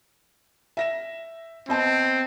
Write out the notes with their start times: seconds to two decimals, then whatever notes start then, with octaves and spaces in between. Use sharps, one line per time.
0.77 E5 A#6 E7
1.69 B3 C4 D#5 A5